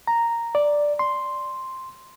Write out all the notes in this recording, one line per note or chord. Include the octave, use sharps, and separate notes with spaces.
A#5
D5
C6